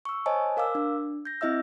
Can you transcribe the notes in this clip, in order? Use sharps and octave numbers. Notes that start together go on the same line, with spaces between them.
C#6 E6
C5 C#5 D#5 G#5 A5
A#4 F5 D6 E6
D4
G6 A#6
C4 E4 D#5 E5 E6